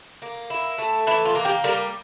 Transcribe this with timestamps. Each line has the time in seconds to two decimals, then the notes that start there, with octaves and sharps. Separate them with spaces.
0.22 A#3
0.50 E4
0.78 A3
1.07 E3 E4
1.25 F4
1.35 A#3
1.45 G4
1.64 G3 A#4